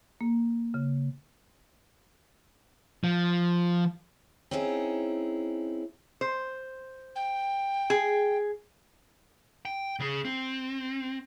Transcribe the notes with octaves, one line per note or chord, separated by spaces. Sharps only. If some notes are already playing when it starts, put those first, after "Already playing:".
A#3
C#3
F3
C4 C#4 D#4 E4 G#4
C5
G5
G#4
G5
C#3 G#4
C4